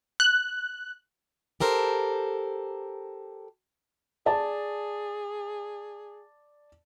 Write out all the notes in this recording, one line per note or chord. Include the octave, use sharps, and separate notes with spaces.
F#6
G4 A4 A#4 C5
G#4 D5 A5